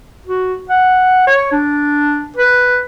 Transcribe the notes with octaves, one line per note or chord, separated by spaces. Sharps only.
F#4
F#5
C#5
D4
B4